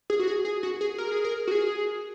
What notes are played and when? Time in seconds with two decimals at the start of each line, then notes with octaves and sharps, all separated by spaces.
0.10 G#4
0.19 F#4
0.28 G#4
0.45 G#4
0.63 F#4
0.81 G#4
0.98 A#4
1.11 G#4
1.24 A#4
1.47 F#4
1.51 G#4